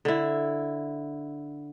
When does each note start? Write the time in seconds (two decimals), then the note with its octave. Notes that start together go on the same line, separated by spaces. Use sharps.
0.05 D3 E4